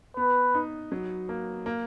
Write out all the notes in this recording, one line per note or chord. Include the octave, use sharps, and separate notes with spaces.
B3 B4
D#4
F#3
A#3
A#3